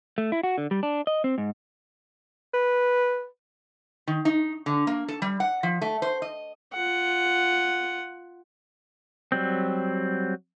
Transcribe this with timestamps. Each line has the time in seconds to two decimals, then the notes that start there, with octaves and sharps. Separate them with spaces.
0.18 A3
0.32 E4
0.43 F#4
0.58 D3
0.71 G3
0.83 D4
1.07 D#5
1.24 C4
1.38 G#2
2.54 B4
4.07 D#3
4.25 D#4
4.66 D3
4.87 A#3
5.08 A4
5.22 G3
5.40 F#5
5.63 F3
5.81 A3
6.02 C5
6.22 D#5
6.74 F4 F#5
9.32 F#3 G3 C4